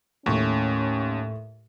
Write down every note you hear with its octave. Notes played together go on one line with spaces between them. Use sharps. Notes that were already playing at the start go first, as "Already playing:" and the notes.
D#2 A2 C#4 C#6